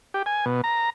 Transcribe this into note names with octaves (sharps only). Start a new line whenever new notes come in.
G4
G#5
B2
A#5